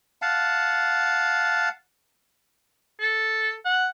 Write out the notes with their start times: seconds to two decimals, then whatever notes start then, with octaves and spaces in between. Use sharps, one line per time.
0.22 F5 F#5 A5
3.00 A4
3.65 F#5